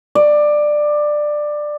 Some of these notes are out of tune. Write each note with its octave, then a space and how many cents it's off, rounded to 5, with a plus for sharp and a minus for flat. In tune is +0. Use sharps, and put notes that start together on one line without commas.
D5 +15